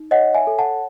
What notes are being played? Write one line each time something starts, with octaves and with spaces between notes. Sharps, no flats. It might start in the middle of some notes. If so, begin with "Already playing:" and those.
Already playing: D#4
C#5 D#5 F#5
E5 G#5
A4
F#5 A5